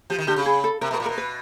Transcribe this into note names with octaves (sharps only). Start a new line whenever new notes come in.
F3 G4
D#3
D3 G4
C#3
G#4
A4
C3 A#4
B2
A#4
A#2
B2 A#4
B4